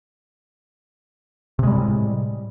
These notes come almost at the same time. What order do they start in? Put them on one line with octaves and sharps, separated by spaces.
C3 G#3 G3 A2